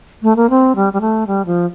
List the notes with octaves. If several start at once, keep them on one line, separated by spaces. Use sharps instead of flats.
A3
A#3
C4
G3
G3
A3
G3
F3